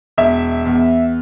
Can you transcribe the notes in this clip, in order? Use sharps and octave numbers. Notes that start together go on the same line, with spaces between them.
E1 E5
E2